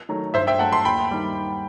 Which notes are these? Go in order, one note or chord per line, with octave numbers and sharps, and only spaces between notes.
D#3 F#3 A3
G2 C5 E5
E5 G5
F#3 A3 F#5 A5
A5 C6
D#2 G5 B5
D#3 G3